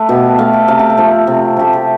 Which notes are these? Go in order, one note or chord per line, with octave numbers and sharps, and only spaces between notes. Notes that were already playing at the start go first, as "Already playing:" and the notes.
Already playing: A3 A4 B4
B2 G4
A3 F5
G5
C3 F5
G5
F5
F3 A3
C3
F3 A3 G4
A4